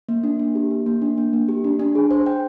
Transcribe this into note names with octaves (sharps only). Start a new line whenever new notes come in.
A#3
D4
A#3
G4
A#3
A#3
D4
A#3
A#3
G4
D4
D4
G#4
C5
G5